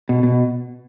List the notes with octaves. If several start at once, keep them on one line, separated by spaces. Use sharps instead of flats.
B2
B2